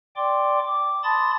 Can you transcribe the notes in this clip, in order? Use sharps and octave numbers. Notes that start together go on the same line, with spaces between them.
D5 G5 C6 D6
D6
A5 B5 C6 D#6 A6